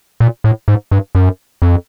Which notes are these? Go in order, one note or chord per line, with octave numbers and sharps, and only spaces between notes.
A#2
A2
G#2
G2
F#2
F2